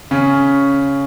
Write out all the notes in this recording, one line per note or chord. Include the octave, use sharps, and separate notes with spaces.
C#3 C#4